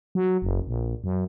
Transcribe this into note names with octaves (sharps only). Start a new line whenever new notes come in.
F#3
F#1
A#1
F#2